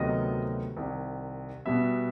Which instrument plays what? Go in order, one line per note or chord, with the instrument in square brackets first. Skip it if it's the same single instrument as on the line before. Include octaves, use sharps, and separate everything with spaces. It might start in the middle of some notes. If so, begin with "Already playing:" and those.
Already playing: [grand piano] D2 C3 D#3 F#3 B3 D#5
C2 C3 D#3
B2 G3 B3 E5